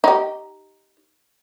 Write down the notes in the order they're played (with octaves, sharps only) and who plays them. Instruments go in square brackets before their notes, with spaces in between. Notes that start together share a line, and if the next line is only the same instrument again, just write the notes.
[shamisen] D#4 G4